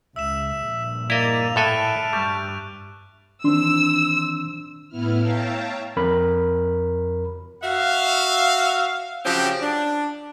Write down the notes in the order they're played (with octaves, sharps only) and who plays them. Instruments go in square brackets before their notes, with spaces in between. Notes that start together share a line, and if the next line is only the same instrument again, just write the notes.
[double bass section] C#2 [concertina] E5 [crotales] E6 E7
[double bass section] A#1 G2
[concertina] A#3 D5 [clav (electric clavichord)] E4 D#5 [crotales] D#7 F7
[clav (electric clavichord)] A2 A4 G#5 [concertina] E5 A5 [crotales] F6 F#6 D7
[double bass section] G2 [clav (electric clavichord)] G3 [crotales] C#6 G6
[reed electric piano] D#3 E3 C4 [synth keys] D4 C6 [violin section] E6
[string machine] A2 B3 E4 F6
C#5 E5 F5 G5 A5 A#5
[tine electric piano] F2 A#4 B5
[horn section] F#4 E5 F5
C#3 F3 F#3 C4 F#4 G4
D4